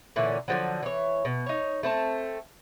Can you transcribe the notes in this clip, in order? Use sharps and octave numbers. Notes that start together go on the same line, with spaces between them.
A#2 D3 E3 C#4
D3 F3 F#3
E3 C#5
B2
D#4 C#5
A3 C4 A5